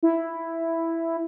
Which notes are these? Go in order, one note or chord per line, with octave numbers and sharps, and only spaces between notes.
E4